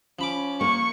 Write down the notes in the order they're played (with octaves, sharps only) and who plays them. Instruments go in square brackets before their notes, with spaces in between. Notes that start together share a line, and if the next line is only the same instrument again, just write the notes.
[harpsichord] F3 B5 D6 [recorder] C#4
[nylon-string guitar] A#3 [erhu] C#6